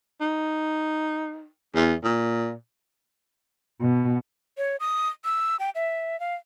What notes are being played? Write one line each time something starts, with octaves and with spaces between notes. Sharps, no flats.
D#4
E2
A#2
B2
C#5
D#6
E6
G5
E5
F5